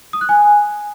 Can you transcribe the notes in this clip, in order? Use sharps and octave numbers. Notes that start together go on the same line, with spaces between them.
D#6
F#6
G#5